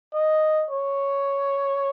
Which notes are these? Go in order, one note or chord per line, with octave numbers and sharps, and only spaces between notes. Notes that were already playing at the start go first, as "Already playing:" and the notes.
D#5
C#5